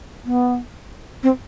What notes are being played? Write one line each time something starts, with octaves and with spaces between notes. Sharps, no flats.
B3
C4